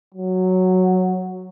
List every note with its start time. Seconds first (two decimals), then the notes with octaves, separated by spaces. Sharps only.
0.15 F#3